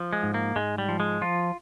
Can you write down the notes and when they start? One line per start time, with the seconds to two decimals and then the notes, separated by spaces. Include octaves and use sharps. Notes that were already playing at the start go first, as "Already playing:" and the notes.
Already playing: F3
0.13 G#3
0.23 G#2
0.34 A#3
0.56 G#2 G#3
0.78 G3
0.89 F3
1.00 G#3
1.21 F3 F4